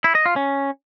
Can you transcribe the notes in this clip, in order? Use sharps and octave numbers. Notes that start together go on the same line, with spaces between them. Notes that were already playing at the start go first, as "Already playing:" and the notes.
E4
D#5
F4
C#4